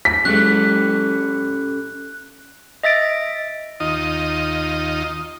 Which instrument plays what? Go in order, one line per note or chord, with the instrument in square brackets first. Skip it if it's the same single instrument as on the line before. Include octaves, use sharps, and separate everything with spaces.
[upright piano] B6
[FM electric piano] F#3 G#3 [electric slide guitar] C#4 G4 A4 [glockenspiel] F#6
[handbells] D#5 E5 A6 D7
[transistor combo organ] D#2 D#4 F4 D#5